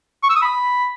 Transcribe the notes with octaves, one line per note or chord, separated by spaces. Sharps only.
C#6
E6
D#6
B5